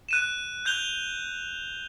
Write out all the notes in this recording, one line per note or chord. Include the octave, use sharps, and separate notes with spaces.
F#6 D#7 E7
F#6 G6 F7 G7